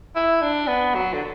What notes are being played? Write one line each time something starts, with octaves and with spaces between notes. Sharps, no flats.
E4
D4
B3
F#3
D3